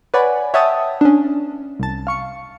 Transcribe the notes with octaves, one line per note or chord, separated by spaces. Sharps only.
B4 C#5 D5 F#5 G#5 B5
C#5 E5 F#5 G5 A5 D#6
C#4 D4
C2 A5
F5 C#6 C#7